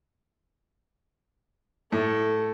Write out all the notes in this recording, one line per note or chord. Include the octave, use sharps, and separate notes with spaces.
A2 A4